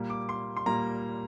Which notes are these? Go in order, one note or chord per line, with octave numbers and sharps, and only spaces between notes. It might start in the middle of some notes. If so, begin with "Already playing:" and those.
Already playing: A#2 G3 A#3
D6
C6
C6
A#2 G3 A#3 A#5